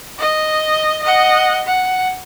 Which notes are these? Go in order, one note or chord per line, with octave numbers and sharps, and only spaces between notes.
D#5
D#5 F#5
F#5